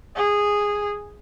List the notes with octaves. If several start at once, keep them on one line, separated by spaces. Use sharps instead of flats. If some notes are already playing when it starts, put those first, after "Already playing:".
G#4